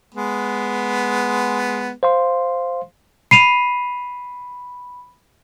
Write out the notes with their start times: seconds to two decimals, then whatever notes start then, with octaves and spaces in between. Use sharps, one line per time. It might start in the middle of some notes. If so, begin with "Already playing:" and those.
0.14 G#3 B3
2.03 C5 F5 C6
3.31 B5 C7 D#7 F7